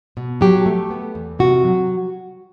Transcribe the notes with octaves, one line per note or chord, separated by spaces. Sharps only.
B2
F#3 G4
A3
B3
E2
C3 F#4
F#3